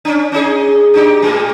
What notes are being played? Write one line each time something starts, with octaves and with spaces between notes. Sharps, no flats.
C#4 D4
C#4 D#4 G#4
D4 D#4 G4
A2 G#3